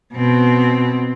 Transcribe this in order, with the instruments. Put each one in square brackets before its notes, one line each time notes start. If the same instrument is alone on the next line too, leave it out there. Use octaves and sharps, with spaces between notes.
[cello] B2 C4